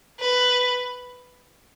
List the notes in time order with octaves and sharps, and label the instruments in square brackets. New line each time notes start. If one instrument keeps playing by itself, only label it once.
[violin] B4